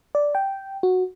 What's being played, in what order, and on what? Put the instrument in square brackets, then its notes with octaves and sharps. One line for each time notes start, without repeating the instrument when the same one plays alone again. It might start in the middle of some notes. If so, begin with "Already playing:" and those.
[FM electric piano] D5
G5
F#4